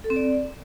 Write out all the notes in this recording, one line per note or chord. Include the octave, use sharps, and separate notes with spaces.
A4
C4
D5